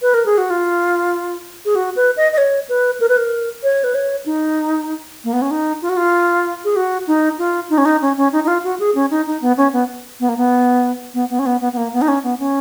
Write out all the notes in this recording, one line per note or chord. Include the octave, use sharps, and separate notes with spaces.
B4
A#4
G#4
F#4
F4
G#4
F#4
B4
D#5
D#5
C#5
B4
A#4
B4
A#4
C#5
B4
C#5
D#4
A#3
B3
C#4
D#4
F4
F#4
F4
G#4
F#4
D#4
F4
D#4
C#4
D#4
C#4
C#4
D#4
D#4
F4
F#4
G#4
C#4
D#4
D#4
B3
C#4
B3
B3
A#3
B3
B3
B3
C#4
B3
B3
B3
A#3
B3
D#4
C#4
B3
C#4